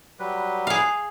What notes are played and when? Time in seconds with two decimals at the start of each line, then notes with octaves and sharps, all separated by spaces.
0.19 F#3 G3 B4
0.67 G#4 F5